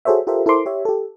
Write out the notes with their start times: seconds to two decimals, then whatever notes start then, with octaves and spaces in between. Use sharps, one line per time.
0.05 F#4 G#4 A4 C5 C#5 E5
0.27 F4 G4 A4 A#4 C5 E5
0.46 E4 A4 A#4 C5 C6 D6
0.66 G4 C#5 E5
0.85 G4 A4